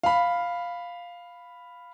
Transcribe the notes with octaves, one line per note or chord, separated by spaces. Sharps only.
F5 B5